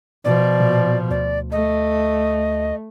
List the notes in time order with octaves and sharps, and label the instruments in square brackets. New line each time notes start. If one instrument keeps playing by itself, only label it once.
[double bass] B2 F3 [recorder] D5
[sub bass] A#2
[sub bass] D2 [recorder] D5
[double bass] A3 [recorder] D#5